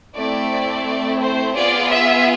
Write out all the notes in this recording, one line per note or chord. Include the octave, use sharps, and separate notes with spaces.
A3 C4 E4 D5
C5
B3 F4 G#4 D5
E5